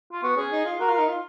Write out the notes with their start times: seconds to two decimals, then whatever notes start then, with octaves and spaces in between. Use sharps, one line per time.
0.12 F4
0.23 B3 F#4
0.37 C#4 G#4
0.52 D#4
0.65 F4
0.79 F#4 A#4
0.89 F4
0.94 D#4 A#4
1.09 F4